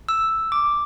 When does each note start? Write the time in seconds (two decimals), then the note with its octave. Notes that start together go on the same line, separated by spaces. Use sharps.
0.09 E6
0.52 D6